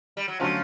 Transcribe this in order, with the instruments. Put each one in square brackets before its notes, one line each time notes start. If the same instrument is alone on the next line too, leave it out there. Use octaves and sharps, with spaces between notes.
[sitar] G3
F#3
[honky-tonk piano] D3 F#3 A3 C#4 F4 [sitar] F3